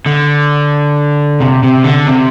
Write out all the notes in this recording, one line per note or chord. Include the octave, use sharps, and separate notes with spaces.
D3
C3
C3
D3
C3